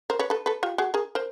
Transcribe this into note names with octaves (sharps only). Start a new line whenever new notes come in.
A#4 C5
B4 C#5
A4 B4
A4 B4
F4 G4
F#4 G#4
G#4 A#4
A#4 C5